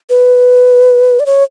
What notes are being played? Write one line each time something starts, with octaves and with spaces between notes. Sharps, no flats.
B4
D5
C#5